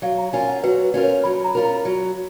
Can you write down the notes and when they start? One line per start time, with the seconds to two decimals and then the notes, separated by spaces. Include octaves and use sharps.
0.02 F#3 F5
0.18 A#5
0.33 C#4 F4 A#4 G#5
0.48 F#5
0.63 F#3 B4
0.84 B4
0.94 C#4 F4 A#4
1.03 C#5
1.24 F#3 B5
1.44 A#5
1.55 C#4 F4 A#4
1.65 A#5
1.85 F#3